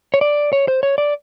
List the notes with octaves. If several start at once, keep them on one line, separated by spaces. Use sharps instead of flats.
C#5
D5
C#5
C5
C#5
D5